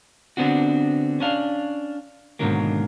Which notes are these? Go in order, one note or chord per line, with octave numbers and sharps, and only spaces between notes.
D3 B3 C4 D4 F#4
C#4 D4 F5
G#2 B2 D3 D#3 F#3 A#3